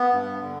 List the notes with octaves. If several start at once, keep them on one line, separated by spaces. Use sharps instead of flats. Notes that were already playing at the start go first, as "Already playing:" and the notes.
Already playing: B3
G2
D3